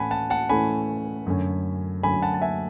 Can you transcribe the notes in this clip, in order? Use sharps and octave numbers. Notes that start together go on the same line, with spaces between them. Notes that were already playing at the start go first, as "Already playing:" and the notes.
Already playing: A2 E3 A3 C#4 F#5 G#5 A5 B5
F#5 A5
F#5 A5
A2 E3 A3 C#4 G#5 B5
F#2 D3 A3 C#4
F#2 D3 A3 C#4 G#5 B5
F#5 A5
A5
E5 G#5